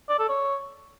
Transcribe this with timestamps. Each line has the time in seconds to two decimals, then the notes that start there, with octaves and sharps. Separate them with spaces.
0.09 D5
0.19 A4
0.29 C#5